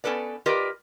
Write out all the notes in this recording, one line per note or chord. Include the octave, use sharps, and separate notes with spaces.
B3 C#4 A4 B4 D5
F4 G4 A#4 B4 D5 D#5